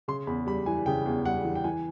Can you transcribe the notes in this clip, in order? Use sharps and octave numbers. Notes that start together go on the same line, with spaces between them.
C#3 C6
E2 B5
G3 B5
E3 G#5
C#3 G5
E2
G3 F#5
E3
G5
E3 G#5